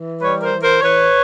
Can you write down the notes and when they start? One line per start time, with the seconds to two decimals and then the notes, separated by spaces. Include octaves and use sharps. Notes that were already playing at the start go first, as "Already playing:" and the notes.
Already playing: E3
0.21 G3 B4 C#5
0.41 A#4 C5
0.51 E3
0.62 A#4 C5
0.81 E3 B4 C#5